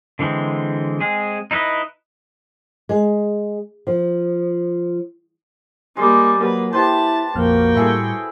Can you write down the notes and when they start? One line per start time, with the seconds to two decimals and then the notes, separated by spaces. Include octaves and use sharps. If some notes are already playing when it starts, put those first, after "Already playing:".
0.19 D3 E3 G#3 C4
1.00 G#3 C4 G#4
1.51 D#4 E4 B4 D#5
2.89 G#3
3.87 F3
5.97 G3 G#3 A#3
6.39 F#3 A#3 B4
6.73 E4 G4 B4 C5 A5
7.35 A#1 F2 A#3 F#4 G5 F6
7.75 A2 G3 E4 G#4 A4 C#7